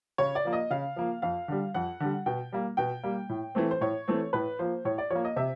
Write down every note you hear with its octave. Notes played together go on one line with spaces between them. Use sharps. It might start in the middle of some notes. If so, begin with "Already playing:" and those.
C#3 C#5
D5
F3 A#3
D#5
C#3 F5
F3 A#3
F2 F5
D3 G3
F2 F#5
D3 G3
B2 G5
G3 A#3
B2 G5
G3 A#3
A2
E3 A3 C4
C5
A2 C#5
E3 A3 C4
A2 B4
F3 A#3 C5
A2 C#5
D5
F3 A#3 C#5
D#5
C3 E5